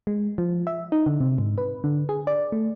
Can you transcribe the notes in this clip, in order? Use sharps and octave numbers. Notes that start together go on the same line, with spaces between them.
G#3
F3
E5
D#4
D3
C3
G#2
B4
D3
G#4
D5
A3